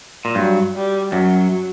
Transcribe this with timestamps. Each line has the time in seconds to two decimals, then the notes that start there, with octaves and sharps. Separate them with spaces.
0.25 A#2
0.35 G2 F#3
0.75 G3
1.12 F#2 F#3